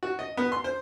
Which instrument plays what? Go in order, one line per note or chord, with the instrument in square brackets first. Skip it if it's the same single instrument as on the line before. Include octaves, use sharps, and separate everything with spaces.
[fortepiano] F#4
D#5
B3
C6
C5